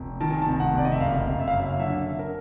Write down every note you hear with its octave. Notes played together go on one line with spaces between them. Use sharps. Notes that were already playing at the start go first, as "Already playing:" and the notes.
Already playing: F1
D#3 A5
G#5
F1 A5
F#5
F1 D5
D#5
E5
F#1 F5
F#1
E5
F5
F#2 E5
D3 E5
D3
A#4